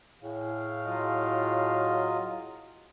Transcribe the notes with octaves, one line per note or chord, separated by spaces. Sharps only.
A2 G#4 F5
F#3 F4 D#5